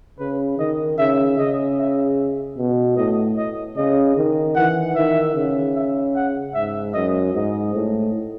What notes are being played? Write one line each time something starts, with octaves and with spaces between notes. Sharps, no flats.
C#3 B4
D#3 D#5
C#3 E5
C#3 D#5
E5
B2
A2 D#5
D#5
C#3 D#5
D#3
E3 F#5
D#3 E5
C#3
E5
F#5
G#2 E5
F#2 D#5
G#2 D#5
A2